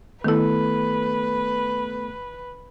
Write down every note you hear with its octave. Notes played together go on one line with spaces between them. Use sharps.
D#3 A3 B3 E4 A4 B4